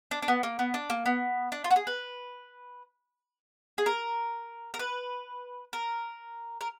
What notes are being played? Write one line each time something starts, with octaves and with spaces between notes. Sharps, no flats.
D4
D4
B3
A#3
B3
D4
A#3
B3
D4
F4
F#4
G#4
B4
G#4
A#4
A#4
B4
A#4
A#4